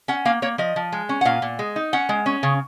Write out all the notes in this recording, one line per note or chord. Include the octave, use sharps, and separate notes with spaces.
C#4 F#5
A#3 F5
A#3 C#5
F3 D#5
F3
G#3
C#4
F#5
A#2 F5
A#2
G#3
D#4
C#4 F#5
G#3
C#4
C#3